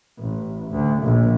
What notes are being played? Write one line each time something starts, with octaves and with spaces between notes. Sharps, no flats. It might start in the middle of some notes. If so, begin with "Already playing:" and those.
A1
D2
A#1